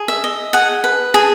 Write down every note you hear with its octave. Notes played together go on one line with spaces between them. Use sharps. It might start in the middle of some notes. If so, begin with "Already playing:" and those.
Already playing: G#4
E5
D#5
G#4 F#5
B4
G#4